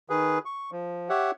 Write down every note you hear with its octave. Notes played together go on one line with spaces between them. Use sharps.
D#3 G#4 B4
C#6
F3
G4 C#5 E5 F#5